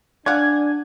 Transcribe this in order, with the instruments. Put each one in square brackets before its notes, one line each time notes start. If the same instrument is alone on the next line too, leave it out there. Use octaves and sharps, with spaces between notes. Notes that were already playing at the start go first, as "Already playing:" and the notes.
[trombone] D4 [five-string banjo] D5 F5 F#5 [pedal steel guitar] G#5